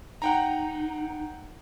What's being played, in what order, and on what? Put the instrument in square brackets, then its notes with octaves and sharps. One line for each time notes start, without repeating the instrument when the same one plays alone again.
[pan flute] D#4 [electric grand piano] F#5 G5 A#5